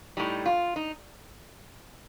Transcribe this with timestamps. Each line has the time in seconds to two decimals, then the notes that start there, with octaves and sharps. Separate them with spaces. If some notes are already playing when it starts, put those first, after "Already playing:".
0.17 A2 G3 D#4
0.46 F4
0.76 D#4